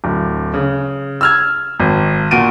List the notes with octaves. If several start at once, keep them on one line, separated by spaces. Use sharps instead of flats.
D1
C#3
E6 F6 G#6
G#1
A#2 F#4 D7 D#7